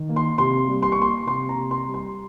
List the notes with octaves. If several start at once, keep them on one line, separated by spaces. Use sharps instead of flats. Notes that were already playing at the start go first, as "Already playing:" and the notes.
Already playing: D#3
A#3
C6
C3 C6
G3
C6
C#6
A#3 C6
C3 C6
A#5
C3
C6
G3
C6